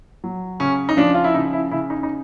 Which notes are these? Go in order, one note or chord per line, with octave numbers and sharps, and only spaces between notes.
F#3
C#3 C#4
D#4
F3 D4
F4
E4
C#3 D#4
E4
C#3 E4
D#4
D#4